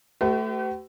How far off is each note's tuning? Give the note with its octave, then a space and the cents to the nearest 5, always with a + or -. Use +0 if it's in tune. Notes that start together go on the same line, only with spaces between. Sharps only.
A3 +0 G4 -45 B4 +45